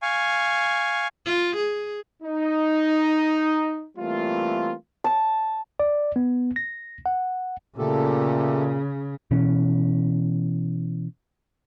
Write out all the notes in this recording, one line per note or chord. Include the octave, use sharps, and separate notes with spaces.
F5 G#5 C#6
F4
G#4
D#4
E3 G3 A3 A#3 C4 F4
A5
D5
B3
A#6
F#5
A#2 C#3 A3 G4 A4
B2 E3 C#4